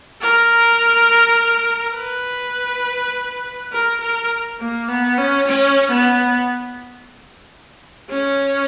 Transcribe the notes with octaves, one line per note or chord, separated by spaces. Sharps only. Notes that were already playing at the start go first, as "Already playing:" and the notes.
A#4
B4
A#4
A#4
A#3
B3
C#4
C#4
B3
C#4